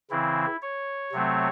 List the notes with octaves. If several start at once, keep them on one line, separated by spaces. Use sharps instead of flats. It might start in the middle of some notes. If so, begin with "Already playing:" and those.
C#3 E3 C4 E4
C#5
C3 F#3 A3 C4